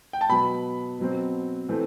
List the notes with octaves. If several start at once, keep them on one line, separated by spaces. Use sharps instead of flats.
G5
A5
B2 F#3 B3 B5
B2 F#3 C4
A2 E3 A3 C4